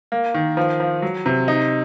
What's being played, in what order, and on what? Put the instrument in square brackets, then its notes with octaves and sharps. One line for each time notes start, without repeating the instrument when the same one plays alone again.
[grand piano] A#3
D#3
F3
F3
F#3
C3
D#4